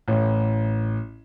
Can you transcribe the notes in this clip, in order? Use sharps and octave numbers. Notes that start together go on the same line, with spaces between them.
A1